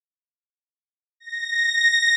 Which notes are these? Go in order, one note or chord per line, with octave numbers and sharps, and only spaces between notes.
A#6